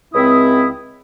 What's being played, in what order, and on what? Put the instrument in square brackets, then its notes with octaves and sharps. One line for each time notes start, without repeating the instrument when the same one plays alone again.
[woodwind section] C#2 C4 E4 D#6